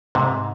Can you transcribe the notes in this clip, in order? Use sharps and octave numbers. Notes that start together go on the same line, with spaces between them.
G#2 C3